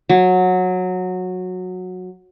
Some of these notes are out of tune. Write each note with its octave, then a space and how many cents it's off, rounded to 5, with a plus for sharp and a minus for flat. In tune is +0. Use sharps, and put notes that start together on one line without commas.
F#3 -15